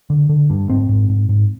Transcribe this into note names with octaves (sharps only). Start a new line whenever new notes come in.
D3
D3
G2
G#2 C4
G#2
G#2
G#2